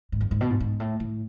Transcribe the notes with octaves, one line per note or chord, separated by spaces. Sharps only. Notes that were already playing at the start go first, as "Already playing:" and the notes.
G#2
F#2
G#2
B2
G#2
G#2
A2
A2